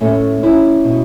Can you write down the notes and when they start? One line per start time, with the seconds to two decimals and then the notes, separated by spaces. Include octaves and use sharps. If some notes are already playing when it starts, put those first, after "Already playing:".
0.01 A2 A3 C#4
0.43 E3 C#4 E4
0.84 B2